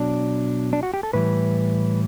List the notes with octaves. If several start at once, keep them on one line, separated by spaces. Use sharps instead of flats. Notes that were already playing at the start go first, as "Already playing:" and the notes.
Already playing: B2 F#3 D4
D4
F#4
G4
A4
A2 E3 G3 B4